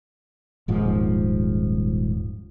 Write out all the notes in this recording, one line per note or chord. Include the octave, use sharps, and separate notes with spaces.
D#1 G#2 F3